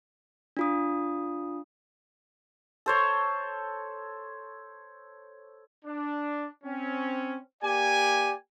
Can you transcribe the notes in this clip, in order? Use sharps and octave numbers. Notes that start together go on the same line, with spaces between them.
D4 F4 D#6
A4 C5 C#5
D4
C4 C#4
A#3 G4 D5 G#5